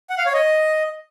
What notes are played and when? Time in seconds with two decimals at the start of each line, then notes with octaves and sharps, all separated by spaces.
0.10 F#5
0.18 F5
0.26 C#5
0.34 D#5